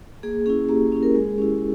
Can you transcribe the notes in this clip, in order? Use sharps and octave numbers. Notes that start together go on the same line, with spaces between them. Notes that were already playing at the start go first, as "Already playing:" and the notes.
A#3 G#4
C#4 E4 G#4
A#3 G4
C#4 E4
A#4
G#3 G#4
C#4 E4 G4